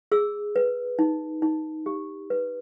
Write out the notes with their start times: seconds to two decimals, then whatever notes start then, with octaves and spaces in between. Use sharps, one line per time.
0.12 G#4 E6
0.56 B4
0.99 D#4
1.42 D#4
1.86 G4
2.30 B4